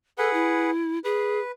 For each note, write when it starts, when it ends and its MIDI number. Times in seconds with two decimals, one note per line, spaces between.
0.18 0.71 68
0.18 0.32 69
0.18 0.71 71
0.18 0.71 78
0.33 0.99 64
1.04 1.39 68
1.04 1.51 71